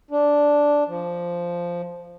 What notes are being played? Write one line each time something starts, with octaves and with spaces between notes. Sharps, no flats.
D4
F3